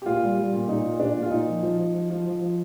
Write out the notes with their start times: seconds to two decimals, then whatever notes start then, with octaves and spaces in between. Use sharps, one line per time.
0.02 G4
0.05 A#2 F4
0.22 G3
0.37 G3
0.53 A#2
0.68 A#2 D#4
0.84 A#2
1.00 A#2 D4
1.15 A#2
1.22 F4
1.30 A#2 D#4
1.47 F3
1.62 F3
1.79 F3
1.94 F3
2.10 F3
2.26 F3
2.41 F3